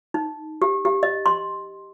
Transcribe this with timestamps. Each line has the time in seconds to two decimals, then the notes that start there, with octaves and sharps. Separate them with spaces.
0.14 D#4
0.62 G4
0.85 G4
1.03 D#5
1.26 C6